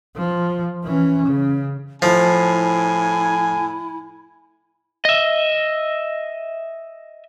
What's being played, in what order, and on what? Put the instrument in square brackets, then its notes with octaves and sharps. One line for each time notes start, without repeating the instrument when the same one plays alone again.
[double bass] F3
E3 C#4
C#3
[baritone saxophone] A2 [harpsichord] F3 [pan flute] E4 [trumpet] G#5
[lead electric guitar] D#5 E5